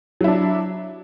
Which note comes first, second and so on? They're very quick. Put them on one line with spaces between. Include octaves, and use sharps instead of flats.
F#3 E4 D4